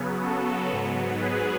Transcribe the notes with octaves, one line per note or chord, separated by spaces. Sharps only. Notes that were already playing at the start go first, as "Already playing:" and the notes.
Already playing: C#3 F#3 B3
F#4 A4
G#2 F#3 B3
G#4 B4